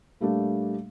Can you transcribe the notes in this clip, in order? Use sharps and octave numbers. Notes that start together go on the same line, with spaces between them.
A#2 G3 A3 A#3 D4